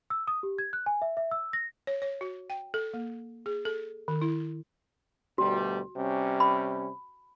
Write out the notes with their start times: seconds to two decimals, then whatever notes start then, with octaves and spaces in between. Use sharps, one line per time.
0.10 E6
0.27 D#6
0.43 G4
0.58 G#6
0.73 F#6
0.86 G#5
1.02 E5
1.17 E5
1.31 E6
1.53 A#6
1.87 C#5
2.02 C#5
2.21 F#4
2.50 G5
2.74 A4
2.94 A#3
3.46 G#4
3.65 A4
4.08 D#3
4.22 E4
5.38 D2 B2 G3 F#4
5.95 C3 G3 C#4
6.40 B5